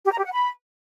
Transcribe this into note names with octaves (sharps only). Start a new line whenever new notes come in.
G4
A#5
G4
F#5
B5